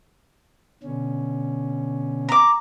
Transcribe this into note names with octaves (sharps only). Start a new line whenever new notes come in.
B2 D3 C#4
A#5 D6